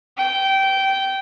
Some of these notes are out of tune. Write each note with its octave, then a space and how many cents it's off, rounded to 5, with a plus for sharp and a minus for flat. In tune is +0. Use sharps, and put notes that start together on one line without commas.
G5 -15